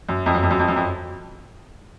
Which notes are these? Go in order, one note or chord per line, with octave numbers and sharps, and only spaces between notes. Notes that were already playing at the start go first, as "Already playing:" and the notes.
F#2
F2
F#2
F2
F#2
F2
F#2
F2